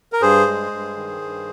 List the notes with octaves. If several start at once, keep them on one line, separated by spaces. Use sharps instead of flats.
A#4
G2 G#4 C5
G#3
G2
D#3
G2